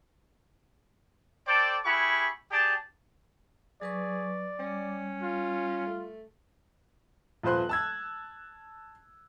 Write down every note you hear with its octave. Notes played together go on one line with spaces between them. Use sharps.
A4 C5 D5 G5 A5 D6
E4 G4 G#4 F#5 B5 C#6
G4 G#4 D5 G5 A5
F#3 G#4 B4 D5 C#6
G3 C#4
F4
A3
D#1 F3 B4 C5 C6 F#6
A5 E6 G#6